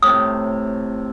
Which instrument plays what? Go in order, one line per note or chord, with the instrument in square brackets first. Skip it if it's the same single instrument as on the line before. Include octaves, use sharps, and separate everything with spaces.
[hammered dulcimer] A2 C3 [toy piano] D#6